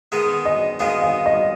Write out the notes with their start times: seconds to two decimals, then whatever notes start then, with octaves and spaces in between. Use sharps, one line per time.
0.12 D#3 G#3 B3 D#4 G#4
0.45 D#5
0.79 D#3 G#3 B3 D#4 G#4 F5
1.02 F5
1.26 D#5